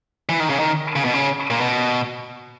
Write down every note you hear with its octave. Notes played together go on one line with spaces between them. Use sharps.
E3
D#3
C#3
D#3
C#3
B2
C#3
A#2
B2